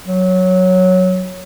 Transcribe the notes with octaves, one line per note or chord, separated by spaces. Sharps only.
F#3